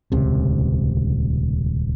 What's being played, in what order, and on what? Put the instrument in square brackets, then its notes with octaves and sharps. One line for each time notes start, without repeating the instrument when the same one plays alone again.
[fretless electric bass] D#1 C#2 C3